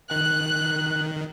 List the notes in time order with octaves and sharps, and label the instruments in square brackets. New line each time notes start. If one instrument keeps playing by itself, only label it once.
[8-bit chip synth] D#3 [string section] F#6